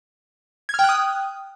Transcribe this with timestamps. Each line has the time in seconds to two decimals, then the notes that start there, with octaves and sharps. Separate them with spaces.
0.69 G#6
0.74 F6
0.79 G5
0.84 F#6
0.89 D#6